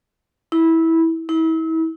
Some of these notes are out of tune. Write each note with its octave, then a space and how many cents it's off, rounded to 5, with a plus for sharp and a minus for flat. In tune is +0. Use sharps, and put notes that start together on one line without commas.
E4 -15
E4 -35